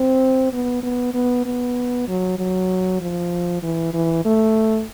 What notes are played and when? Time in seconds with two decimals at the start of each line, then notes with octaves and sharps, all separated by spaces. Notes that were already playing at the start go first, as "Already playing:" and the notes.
Already playing: C4
0.53 B3
0.83 B3
1.14 B3
1.45 B3
2.08 F#3
2.38 F#3
3.01 F3
3.63 E3
3.94 E3
4.25 A3